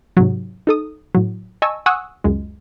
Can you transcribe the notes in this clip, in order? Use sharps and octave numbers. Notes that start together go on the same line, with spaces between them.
G#2 C3 F#3
D#4 A4 D#6
A2 F#3
D#5 G#5 A5 C#6 E6
F#5 G#5 C#6 D#6 E6 F#6
C#2 F#2 G#3